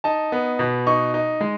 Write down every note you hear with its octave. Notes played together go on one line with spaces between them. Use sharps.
D#4 A5
B3
B2
D#4 C#6
D#4
G#3